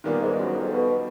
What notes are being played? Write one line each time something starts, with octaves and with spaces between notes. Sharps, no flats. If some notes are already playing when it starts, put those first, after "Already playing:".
A#2 D#3 G3 A#3 B3 D4
G#2 G#3
F#2 F#3
F2 F3
B2